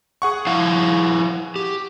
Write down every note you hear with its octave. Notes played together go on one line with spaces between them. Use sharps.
G#4 F#5 C#6
F3 E4 F5
G4